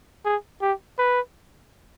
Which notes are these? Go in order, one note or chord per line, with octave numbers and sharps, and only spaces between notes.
G#4
G4
B4